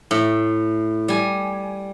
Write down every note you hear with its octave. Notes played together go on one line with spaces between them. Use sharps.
A2
G3 G#5